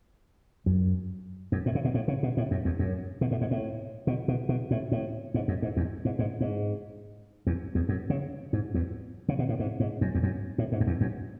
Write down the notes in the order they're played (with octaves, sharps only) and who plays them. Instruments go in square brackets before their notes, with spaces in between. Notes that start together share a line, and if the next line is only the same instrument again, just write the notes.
[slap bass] F#2
F#2
A2
C#3
B2
A2
C#3
B2
A2
F#2
E2
F#2
B2
A2
G#2
A2
B2
B2
B2
A2
A2
G#2
F#2
G#2
E2
G#2
G#2
G#2
E2
E2
F#2
C#3
G#2
E2
C#3
B2
A2
G#2
G#2
F#2
E2
F#2
A2
G#2
F#2
E2
F#2